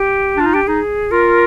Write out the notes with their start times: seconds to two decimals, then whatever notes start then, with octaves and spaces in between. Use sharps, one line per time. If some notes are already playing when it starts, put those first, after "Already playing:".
Already playing: G4
0.37 D4 F4
0.46 D#4
0.54 D4 G4
0.67 D#4 G#4
1.11 F4 A#4